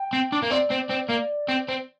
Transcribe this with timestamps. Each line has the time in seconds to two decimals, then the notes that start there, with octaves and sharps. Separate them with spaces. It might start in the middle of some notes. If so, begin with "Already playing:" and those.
Already playing: G5
0.13 C4
0.32 D4
0.43 A#3
0.51 C4 D5
0.71 C4
0.90 C4
1.10 A#3
1.49 C4
1.68 C4